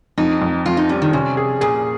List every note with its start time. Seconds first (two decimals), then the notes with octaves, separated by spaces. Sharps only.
0.18 F2 D#4
0.42 F2
0.66 F2 F4
0.77 D#4
0.89 G3 C#4
1.02 D#3
1.13 C3 C#4
1.37 G#4
1.61 A#2 G#4